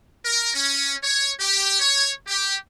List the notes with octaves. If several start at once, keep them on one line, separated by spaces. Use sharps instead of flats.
A#4
C#4
C#5
G4
C#5
G4